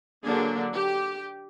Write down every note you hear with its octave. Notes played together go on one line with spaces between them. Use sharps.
D3 F#3 A#3 D4 G#4
G4